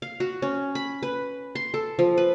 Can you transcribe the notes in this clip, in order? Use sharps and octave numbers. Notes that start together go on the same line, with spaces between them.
F5
F#4
C#4
B5
B4
C6
A4
F3
B4